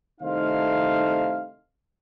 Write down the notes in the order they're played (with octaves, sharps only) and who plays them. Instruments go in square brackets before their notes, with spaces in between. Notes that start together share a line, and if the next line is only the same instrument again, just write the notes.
[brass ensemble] C2 D#3 A3 D#4 C5 F5